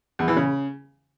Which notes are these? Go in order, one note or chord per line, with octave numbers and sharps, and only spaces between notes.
E2
E3
C#3